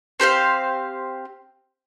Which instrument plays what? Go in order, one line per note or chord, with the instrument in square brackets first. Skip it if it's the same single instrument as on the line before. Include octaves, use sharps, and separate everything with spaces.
[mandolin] C4 G4 C5 F5